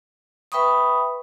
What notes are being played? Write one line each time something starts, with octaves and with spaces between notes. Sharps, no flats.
B4 E5 G5 B5 C#6 D#6